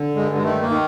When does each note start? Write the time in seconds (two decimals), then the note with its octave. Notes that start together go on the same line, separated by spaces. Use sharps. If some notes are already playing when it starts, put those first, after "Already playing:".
Already playing: D3
0.16 G2 G#3
0.35 G#3
0.43 D#3 A3
0.61 A#3
0.69 D#3